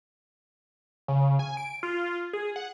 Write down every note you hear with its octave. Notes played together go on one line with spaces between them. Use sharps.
C#3
G#5
D7
F4
G#4
F#5